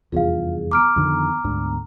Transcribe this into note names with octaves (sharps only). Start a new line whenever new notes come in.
F1 E2 G2 F4 G#4 F5
B3 A#5 D6 F6 D7
F2 D3 D#3
D2 G#2 D3